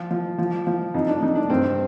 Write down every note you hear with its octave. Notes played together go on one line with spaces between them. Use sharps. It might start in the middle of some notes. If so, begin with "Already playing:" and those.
Already playing: F3 F4
F3
F3
F3
F2 D#4
D4
F2 D#4
D4
G2 C4